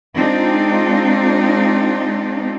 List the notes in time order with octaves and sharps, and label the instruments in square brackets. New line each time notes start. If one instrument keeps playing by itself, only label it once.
[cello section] G#3 C4 D4 D#4 F4